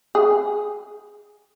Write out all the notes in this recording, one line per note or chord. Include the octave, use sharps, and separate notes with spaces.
G#4